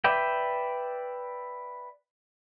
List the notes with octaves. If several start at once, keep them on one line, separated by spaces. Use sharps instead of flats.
B4 D5 E5 G5